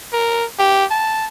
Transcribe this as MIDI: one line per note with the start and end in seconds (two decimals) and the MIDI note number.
0.13 0.45 70
0.59 0.85 67
0.91 1.27 81